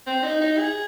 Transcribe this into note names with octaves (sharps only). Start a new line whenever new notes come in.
C4
D#4
D#4
G#4